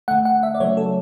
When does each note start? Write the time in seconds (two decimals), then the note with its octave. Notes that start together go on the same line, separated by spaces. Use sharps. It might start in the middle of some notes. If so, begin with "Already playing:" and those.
0.08 D3 A3 F#5
0.25 F#5
0.43 E5
0.54 D5
0.60 C#3 F#3 A3 C#5
0.77 A4